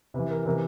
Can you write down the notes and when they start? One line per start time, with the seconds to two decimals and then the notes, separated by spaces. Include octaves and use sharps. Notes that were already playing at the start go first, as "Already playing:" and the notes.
0.14 C3 B4
0.19 E3
0.31 A#4
0.46 C3 E3 A#4